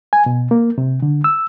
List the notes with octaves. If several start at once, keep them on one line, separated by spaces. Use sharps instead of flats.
G#5
B2
A#3
C3
D3
E6